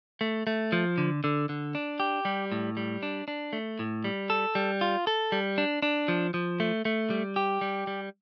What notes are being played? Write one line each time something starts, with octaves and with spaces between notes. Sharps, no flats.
A3
A3
F3
D3
D3
D3
D4
G4
G3
A2
G3
D4
D4
A3
A2
G3
A4
G3
F4
A4
G3
D4
D4
F3
F3
A3
A3
G3
G4
G3
G3